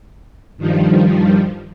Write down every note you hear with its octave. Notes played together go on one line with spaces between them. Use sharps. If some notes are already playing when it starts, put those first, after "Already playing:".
G2 D#3 F3 G3